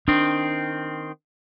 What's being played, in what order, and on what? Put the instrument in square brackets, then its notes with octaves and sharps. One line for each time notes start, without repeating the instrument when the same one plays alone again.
[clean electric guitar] D#3 C4 [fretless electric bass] D4